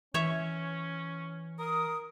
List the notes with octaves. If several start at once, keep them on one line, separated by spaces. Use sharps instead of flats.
E3 C#4 C#5 E5
A#4 D#6